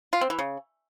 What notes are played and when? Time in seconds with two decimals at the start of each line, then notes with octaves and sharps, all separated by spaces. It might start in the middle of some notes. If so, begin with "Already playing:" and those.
0.13 F4
0.21 C4
0.30 E3
0.39 C#3